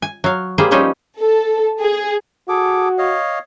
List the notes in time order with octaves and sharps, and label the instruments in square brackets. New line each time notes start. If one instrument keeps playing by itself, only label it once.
[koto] G#5
F#3 F5
G3 A#3 G#4 C5
F3 G3 C#4 D#4 C5
[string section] A4
G#4
[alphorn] F#4 [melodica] G#4 A4 D6
[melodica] C#5 D#5 F5